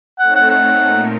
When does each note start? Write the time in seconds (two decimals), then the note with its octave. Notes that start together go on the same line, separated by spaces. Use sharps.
0.19 A3 C4 D#4 A4 C#5 F#5
0.35 F#5
0.50 F#5
0.81 A#2 A3 D#4 A#4